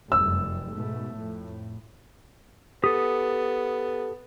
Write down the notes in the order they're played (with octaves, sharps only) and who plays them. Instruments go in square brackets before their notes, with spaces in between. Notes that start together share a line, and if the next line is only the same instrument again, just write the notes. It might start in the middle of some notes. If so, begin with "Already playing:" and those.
[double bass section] F1 F#2 G3 [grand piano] E6
[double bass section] G#2 B2 A3
F2 A2
[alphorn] B3 [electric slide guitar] G4 A4 [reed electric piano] D#6